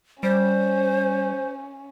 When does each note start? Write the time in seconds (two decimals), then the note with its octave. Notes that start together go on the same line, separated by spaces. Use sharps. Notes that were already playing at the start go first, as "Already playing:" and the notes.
0.23 G3 C#4 C5